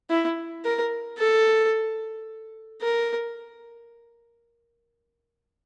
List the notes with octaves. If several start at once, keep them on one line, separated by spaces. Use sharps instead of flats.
E4
A#4
A4
A#4